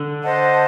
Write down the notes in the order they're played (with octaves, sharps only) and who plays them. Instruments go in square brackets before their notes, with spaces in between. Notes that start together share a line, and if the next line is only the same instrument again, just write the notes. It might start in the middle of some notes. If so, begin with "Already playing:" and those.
Already playing: [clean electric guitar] D3
[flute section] C5 D#5 F#5 A5